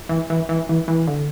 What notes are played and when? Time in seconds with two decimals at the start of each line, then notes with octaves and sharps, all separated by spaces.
0.09 E3
0.30 E3
0.49 E3
0.69 E3
0.88 E3
1.07 D3